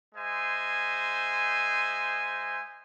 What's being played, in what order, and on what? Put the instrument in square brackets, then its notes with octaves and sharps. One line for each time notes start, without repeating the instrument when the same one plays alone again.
[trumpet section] G#3 C5 E5 G#5